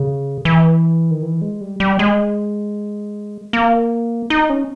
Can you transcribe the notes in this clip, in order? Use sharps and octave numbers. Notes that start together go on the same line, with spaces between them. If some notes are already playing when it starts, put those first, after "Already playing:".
Already playing: C#3
E3
D#3
E3
G#3
G3
G3
G#3
A#3
D#4
C#4